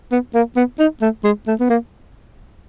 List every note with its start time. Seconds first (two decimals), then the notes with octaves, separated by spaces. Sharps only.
0.12 B3
0.35 A#3
0.56 B3
0.79 D#4
1.02 A3
1.24 G#3
1.47 A3
1.60 B3
1.70 A#3